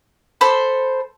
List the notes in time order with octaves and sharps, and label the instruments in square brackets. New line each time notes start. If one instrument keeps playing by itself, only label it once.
[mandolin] A4 C5 B5